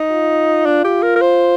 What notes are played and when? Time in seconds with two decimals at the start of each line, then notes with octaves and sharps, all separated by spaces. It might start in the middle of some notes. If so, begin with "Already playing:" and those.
Already playing: D#4
0.11 F4
0.66 D4
0.84 G4
1.02 A#4
1.16 A#4
1.21 C5